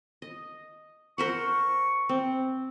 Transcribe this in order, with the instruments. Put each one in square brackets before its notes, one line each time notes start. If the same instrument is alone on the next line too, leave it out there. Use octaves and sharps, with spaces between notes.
[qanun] D#5
[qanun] A#4 C5 F#5 [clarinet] C#6
[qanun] C4